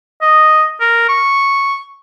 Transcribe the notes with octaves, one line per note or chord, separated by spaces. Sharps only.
D#5
A#4
C#6